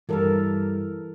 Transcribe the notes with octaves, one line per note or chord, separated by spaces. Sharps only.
G2 E3 G3 A4 A#4